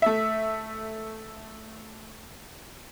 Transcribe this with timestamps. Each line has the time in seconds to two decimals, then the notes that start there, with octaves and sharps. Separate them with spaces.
0.02 A3 E5